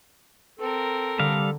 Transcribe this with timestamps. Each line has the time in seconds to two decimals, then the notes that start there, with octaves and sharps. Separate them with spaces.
0.59 C4 A4 A#4
1.19 D3 G3 F5